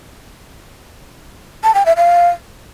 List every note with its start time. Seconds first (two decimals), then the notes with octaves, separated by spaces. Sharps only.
1.64 A5
1.75 G5
1.86 E5
1.97 F5